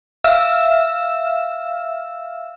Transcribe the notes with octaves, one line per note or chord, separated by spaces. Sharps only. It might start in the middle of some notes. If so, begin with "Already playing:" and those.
E5 F5 E6 F6 E7